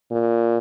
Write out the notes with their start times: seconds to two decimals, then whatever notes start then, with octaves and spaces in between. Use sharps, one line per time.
0.12 A#2